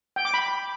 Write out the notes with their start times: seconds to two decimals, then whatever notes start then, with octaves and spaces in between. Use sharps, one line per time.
0.16 G5
0.25 D6
0.34 B5